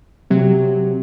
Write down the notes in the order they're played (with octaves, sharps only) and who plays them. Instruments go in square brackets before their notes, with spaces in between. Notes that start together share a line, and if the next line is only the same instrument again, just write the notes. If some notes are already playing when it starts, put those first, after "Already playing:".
[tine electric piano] C3 [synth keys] F#3